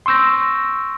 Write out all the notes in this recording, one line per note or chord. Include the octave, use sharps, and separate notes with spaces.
C6 C#6 E6 G6 A#6